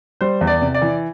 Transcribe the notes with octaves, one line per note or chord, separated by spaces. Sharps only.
G3 C5
E2
D5
C3
D5
E3